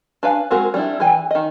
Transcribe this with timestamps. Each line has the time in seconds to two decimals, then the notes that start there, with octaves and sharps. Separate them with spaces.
0.23 D4 B4 F5 G#5
0.51 G#3 C4 F#4 A#4
0.74 G3 D4 E4
1.00 E3 E4 G4 G#5
1.31 D#3 D#5